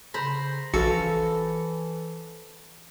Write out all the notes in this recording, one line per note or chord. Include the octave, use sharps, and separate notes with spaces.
C#3 C5 A#5 B5
A#1 E3 F#4 A4 F5 C#7